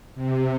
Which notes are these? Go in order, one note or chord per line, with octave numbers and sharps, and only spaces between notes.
C3